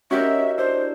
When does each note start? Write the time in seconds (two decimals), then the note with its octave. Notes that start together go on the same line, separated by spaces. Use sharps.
0.11 C#4 D#4 F#4 G4 A#4 C#5 E5
0.58 D4 E4 C5